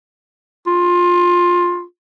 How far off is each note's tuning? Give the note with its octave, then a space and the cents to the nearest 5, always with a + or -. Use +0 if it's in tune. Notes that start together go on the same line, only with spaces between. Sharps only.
F4 +15